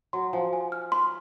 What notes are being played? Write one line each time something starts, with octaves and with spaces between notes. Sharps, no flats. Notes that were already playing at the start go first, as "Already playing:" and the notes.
F#3 C6
F3 G#5
G#5
F6
C6